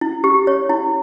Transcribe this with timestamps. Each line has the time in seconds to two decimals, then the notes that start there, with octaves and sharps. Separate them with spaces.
0.01 E4
0.24 G4
0.47 C#5
0.70 E4